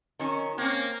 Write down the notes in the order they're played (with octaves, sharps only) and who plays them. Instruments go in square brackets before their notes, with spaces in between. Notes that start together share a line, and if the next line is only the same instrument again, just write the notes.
[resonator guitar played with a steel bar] D#3 F#3 C#4
[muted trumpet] A#3 [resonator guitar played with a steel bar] C4 C#4